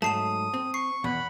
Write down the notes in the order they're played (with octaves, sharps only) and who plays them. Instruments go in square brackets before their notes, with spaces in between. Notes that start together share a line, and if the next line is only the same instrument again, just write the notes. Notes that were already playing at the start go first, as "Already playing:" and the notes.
[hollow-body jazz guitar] G#2 F#3 A3 [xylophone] A5 C7 E7 [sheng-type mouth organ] D#6
[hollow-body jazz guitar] C4
[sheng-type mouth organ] C#6 [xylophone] C7
[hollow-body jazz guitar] E2 B2 [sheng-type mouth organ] F#5 B5